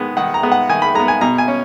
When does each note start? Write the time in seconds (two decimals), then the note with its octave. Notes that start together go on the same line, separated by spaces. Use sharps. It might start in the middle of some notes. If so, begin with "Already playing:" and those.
Already playing: D#3 G#3 B3
0.17 D#3 F#5
0.34 A#5
0.43 G#3 B3
0.52 F#5
0.69 D#3 G#5
0.82 B5
0.95 G#3 B3 A#5
1.08 G#5
1.21 B2 A#5
1.38 G#5
1.48 C#4